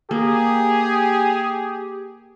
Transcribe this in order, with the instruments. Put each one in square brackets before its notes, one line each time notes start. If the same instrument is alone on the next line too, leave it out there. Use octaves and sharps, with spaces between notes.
[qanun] A#3 [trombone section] G4 [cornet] G#4